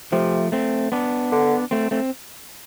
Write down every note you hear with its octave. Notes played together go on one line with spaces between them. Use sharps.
C3 F3 A3
A3 C4
B3 D4
D3
A3 C4
A3 C4